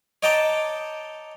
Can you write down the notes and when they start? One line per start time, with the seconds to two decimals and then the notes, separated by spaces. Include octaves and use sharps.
0.23 C#5 D#5 G5 A5 A#5 D6